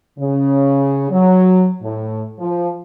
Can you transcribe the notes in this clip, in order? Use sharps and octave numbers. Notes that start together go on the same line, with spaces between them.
C#3
F#3
A2
F3